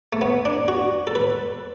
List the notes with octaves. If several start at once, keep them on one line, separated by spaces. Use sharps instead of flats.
A3
B3
D4
F#4
A4
B4